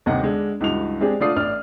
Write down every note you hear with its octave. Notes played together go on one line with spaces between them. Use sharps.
G1 D#2 C3 D#5 F#5
D3 G#3 D4
C#2 G2 E3 F#4 F7
G#3 C4 D4 G4 G#4
D3 A3 F4 D5 D#6 C7
A1 D4 D5 F6